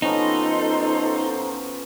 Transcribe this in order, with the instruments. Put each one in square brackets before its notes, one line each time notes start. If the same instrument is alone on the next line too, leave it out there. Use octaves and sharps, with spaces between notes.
[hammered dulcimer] F3 B3 C#4 [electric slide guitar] D#4 [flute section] A4 C5 A#5